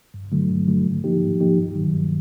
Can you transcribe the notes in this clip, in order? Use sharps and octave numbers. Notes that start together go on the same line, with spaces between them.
G2
D3 F#3 A3
G2
D3 F#3 A3
G#2
F3 A#3 D#4 G4
G#2
F3 A#3 D#4 G4
G2
D#3 F#3
G2